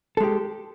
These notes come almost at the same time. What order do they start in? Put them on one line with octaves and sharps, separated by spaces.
A4 G#3 G4